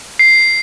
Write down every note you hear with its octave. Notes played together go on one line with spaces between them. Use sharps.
C7